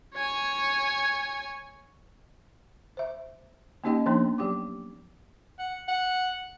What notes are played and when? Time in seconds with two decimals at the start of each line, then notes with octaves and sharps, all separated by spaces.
0.15 C#5 G#5
2.97 C5 E5
3.84 A#3 C#4 D#4 G4 D#5 G5
4.06 F3 A#3 B3 D4 D#4
4.38 F#3 G4 G5 D6
5.59 F#5
5.88 F#5